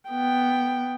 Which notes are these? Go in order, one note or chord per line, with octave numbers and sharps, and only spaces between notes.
B3 G5